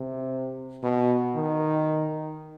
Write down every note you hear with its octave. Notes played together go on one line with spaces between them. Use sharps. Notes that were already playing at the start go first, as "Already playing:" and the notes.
Already playing: C3
B2
D#3